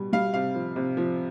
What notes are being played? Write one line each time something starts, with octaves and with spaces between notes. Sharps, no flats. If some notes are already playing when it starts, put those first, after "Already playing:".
Already playing: B2 G3
G3 F5
C3 F5
F3
C3
F3